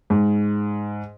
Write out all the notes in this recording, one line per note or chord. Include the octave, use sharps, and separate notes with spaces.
G#2